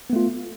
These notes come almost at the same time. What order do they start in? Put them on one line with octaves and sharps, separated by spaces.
B3 A3 F4